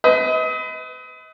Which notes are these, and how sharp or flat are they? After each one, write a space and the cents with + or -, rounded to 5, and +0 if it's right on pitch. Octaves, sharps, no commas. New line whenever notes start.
B4 +35 D#5 +35